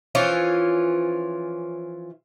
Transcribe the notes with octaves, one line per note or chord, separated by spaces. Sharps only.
E3 F3 C#4 F4